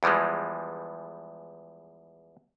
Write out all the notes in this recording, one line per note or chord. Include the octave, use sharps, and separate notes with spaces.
E2 E3 F3 G3 G#3